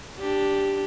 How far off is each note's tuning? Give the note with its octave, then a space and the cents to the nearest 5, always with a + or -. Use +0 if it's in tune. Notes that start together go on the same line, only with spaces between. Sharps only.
D4 +0 G4 +0